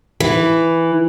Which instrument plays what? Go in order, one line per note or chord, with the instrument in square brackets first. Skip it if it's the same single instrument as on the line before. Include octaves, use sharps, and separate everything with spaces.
[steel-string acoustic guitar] E3